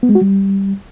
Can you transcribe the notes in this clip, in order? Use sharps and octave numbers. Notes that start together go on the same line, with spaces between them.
B3
G#3
F#4
G3